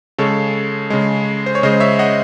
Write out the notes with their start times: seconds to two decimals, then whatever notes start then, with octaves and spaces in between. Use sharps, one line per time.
0.18 C#3 G#3 A4 C#5
0.90 C#3 G#3
1.46 C5
1.55 C#5
1.63 C#3 G#3 C5 D#5
1.80 C#5 E5
1.99 D#5 F#5